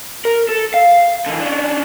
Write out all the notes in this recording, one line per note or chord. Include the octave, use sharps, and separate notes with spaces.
A#4
A4
F5
D3 E3
C#4 D4